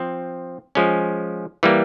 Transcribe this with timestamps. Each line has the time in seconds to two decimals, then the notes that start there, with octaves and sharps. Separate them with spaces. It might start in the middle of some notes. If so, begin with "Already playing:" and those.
Already playing: F3 C4
0.75 F3 G#3 C#4
1.63 E3 G3 A#3